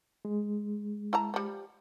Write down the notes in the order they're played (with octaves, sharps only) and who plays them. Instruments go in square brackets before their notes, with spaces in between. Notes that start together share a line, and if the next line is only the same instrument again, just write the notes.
[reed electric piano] G#3
[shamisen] E4 A5 A#5
F3 G3